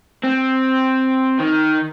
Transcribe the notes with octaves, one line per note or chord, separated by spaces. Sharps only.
C4
D#3